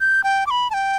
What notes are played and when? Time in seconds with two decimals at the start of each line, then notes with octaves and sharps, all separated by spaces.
0.01 G6
0.24 G5
0.47 D6
0.51 B5
0.70 A5
0.74 G5